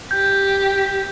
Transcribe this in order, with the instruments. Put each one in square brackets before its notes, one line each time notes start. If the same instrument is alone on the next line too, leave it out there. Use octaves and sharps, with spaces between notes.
[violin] G4 [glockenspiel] G6